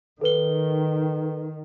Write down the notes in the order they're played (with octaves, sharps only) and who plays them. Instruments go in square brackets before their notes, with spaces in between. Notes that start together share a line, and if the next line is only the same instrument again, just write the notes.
[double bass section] D#3 [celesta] A4 B4 G7